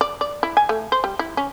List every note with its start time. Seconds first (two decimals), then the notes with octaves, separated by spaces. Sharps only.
0.01 D5
0.21 D5
0.43 E4
0.57 G#5
0.69 A3
0.92 C5
1.04 G3
1.19 E4
1.37 C#4